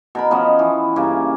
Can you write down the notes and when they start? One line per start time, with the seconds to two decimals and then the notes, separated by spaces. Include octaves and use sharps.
0.15 B2 A#4 B5
0.31 F3 B3 C#4 D#5
0.59 E3
0.96 G2 C#3 A#3